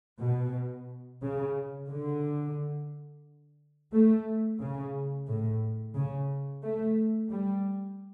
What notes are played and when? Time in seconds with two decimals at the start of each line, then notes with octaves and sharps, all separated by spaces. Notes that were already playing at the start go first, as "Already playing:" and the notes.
0.21 B2
1.22 C#3
1.89 D3
3.93 A3
4.60 C#3
5.27 A2
5.95 C#3
6.63 A3
7.30 G3